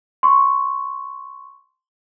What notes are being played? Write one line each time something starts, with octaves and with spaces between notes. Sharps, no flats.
C6 C#6